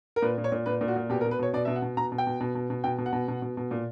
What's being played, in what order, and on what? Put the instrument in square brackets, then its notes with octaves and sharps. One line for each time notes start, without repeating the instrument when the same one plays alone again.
[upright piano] A#4
A#2 B4
A#2
C#5
A#2
A#2 B4
A#2
F#4
A#2
B2 G4
A#4
B2
B4
B2 C#5
B2 D5
B2 E5
F#5
B2
B2 A#5
B2
G5
B2
B2
B2
B2
B2 G5
B2
F#5
B2
B2
B2
B2
A#2